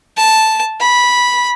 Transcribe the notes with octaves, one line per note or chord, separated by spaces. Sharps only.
A5
B5